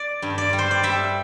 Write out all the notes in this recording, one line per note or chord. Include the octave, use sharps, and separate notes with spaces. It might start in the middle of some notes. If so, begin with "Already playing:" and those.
Already playing: D5
G2
D5
G3
C5
D5
G3 E5